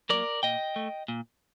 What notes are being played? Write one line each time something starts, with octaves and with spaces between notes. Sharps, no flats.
F#3 A#3 A#4 D5
A#2 D#5 G5
A3
A#2